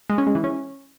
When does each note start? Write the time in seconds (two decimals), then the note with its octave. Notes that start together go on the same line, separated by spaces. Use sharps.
0.09 G#3
0.18 C#4
0.27 G#3
0.35 E3
0.44 C#4